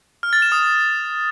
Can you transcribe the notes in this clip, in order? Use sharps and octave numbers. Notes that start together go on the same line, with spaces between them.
F6
A6
E7
D#6